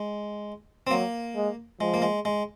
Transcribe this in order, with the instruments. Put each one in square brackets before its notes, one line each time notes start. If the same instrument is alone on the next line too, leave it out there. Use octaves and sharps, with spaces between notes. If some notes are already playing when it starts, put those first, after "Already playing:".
Already playing: [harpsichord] G#3
C4
[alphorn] F#3 [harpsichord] A#3
[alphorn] G#3
[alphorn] F3 [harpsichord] G#3
[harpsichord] A#3
G#3
G#3